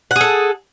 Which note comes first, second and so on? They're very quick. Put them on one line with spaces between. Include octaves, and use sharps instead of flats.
F#5 G#4 A4